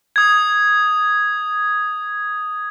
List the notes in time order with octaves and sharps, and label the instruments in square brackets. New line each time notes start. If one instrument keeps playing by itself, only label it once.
[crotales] D#6 G#6